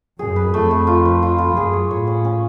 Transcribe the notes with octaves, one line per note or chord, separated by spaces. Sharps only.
F#2 G#4
B4
F2 A3
A3
F4
B4
F4
F4
F#2 G#4
C#5
A2 C#5
C#4
C#4